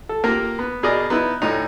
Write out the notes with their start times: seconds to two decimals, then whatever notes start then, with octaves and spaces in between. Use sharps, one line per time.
0.09 A4
0.24 A#3 F4 G4 A#4
0.59 B3
0.83 B2 G#4 A#4 D5 D#5
1.10 B3 D#4 E4
1.42 D2 A2 D#4